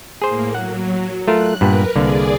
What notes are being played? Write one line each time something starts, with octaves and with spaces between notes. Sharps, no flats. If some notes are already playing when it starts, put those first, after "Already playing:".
A2 A#3 G#4 C5
F#3 F#5
A3 F4 A#4 F#6
G2 A#2 B3 A#4 B4
C2 D3 A#3 G#4 D5